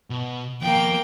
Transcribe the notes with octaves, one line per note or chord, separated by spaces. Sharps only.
B2
D#2 F3 A#3 G5